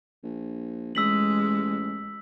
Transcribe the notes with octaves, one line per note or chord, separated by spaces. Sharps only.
A#1
A1 G#3 E6 B6 F#7